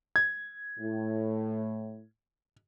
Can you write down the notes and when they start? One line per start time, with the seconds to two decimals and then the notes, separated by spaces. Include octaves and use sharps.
0.16 G#6
0.78 A2